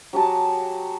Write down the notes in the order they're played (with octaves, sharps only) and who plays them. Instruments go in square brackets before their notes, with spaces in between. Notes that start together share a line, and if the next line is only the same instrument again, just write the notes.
[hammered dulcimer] F#3 G4 G#4 A5